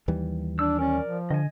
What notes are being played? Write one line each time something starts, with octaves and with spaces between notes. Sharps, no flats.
D#2 E3 G3
D4 E6
C#4 A#4 D5
F3
D3 D#5 G#5